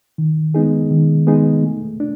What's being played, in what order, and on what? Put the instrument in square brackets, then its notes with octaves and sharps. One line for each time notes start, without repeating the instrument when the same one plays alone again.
[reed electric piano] D#3
G#3 B3 D#4 G#4
D#3
G#3 B3 D#4 G#4
A3
D4